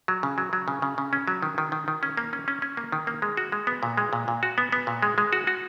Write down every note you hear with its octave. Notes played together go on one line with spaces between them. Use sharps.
F#3
C#3
F#3
F#3
C#3
C#3
C#3
C#4
F#3
D#3
D#3
D#3
D#3
C#4
A#3
C#4
C#4
C#4
A#3
D#3
A#3
G#3
F#4
G#3
B3
A#2
G#3
A#2
A#2
F#4
B3
B3
A#2
G#3
G#3
F#4
F#4